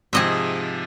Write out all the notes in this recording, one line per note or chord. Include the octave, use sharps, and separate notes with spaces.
G#2 C3 F3 G#4 D#5 E5